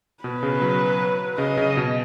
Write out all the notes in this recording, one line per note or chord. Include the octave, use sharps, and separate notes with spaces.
B2 B4
C#3
F#3
C#3 D#5
C#3
B2